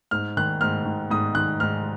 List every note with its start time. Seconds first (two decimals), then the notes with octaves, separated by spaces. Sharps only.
0.11 G#2 F6
0.37 D#3 F#6
0.61 G#2 F6
0.85 D#3
1.10 G#2 D#6
1.35 D#3 F#6
1.60 G#2 F6